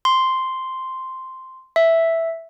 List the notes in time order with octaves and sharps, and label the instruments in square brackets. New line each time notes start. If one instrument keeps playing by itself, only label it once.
[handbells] C6
E5